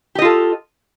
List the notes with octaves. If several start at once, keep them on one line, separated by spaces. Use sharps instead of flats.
F4 G4 A4 D#5